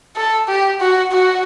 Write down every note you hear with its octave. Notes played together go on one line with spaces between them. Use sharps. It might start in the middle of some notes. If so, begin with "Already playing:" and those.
A4
G4
F#4
F#4